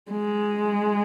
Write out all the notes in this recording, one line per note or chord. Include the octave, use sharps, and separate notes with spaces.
G#3